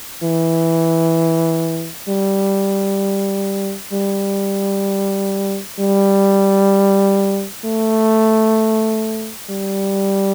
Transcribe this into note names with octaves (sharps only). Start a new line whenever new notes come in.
E3
G3
G3
G3
A3
G3